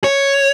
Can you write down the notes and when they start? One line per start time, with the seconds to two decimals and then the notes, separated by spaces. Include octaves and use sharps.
0.04 C#5